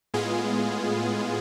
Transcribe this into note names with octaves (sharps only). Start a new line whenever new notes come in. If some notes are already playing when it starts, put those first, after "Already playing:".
A2 G#3 B3 F4 G#4